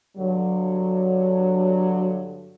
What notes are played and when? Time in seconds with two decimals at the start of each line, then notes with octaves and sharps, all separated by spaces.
0.17 G2 D3 F#3